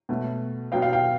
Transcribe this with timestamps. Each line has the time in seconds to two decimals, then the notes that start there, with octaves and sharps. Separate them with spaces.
0.09 B2 F#3 A3
0.72 B2 F#3 B3 F5 G5
0.82 F5 G5
0.93 F5 G5